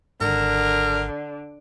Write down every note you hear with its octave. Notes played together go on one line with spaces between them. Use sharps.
G#1 D3 A#4